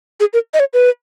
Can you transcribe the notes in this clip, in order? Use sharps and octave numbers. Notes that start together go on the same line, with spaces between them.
G#4
A#4
D#5
C#5
B4